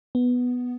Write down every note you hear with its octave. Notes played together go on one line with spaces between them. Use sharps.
B3